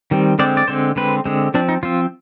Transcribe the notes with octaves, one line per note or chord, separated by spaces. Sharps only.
D#3 G3 C4
D3 G#3 C4 D5
D5
D3 G#3 C4 C5
D3 G#3 C4 B4
D3 G#3 C4
F3 C4 D4
D#4
F3 C4 F4